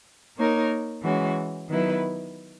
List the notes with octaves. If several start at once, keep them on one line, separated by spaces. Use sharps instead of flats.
A#3 D#4 A#4 C#5
E3 G#3 C#4 F#4
D#3 F#3 B3 E4 B4